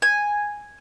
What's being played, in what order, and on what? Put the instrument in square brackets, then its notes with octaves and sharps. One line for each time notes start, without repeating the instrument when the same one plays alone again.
[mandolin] G#5